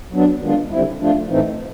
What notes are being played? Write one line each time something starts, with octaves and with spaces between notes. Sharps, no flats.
F#3 B3 D4
D#3 G#3 B3 D4 F4
D3 G3 C4 E4
F3 A3 D4 F4
A2 E3 A3 C4 D#4